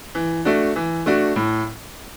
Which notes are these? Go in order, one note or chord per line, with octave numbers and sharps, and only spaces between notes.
E3
A3 D4 F#4
E3
A3 D4 F#4
A2